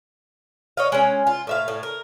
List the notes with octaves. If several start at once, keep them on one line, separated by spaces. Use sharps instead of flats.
C#5 D#5 F5
G#3 C#4
F4
A2 E5 F5
A2
A#4